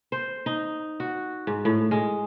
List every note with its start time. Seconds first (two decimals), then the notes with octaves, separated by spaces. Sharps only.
0.12 C5
0.46 D#4
1.00 F#4
1.47 G#2
1.65 A2
1.91 G#3